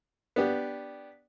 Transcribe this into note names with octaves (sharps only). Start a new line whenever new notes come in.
B3 D4 G4